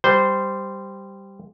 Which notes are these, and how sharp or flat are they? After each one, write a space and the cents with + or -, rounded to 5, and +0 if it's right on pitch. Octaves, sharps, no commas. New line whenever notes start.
G3 +0 C5 -10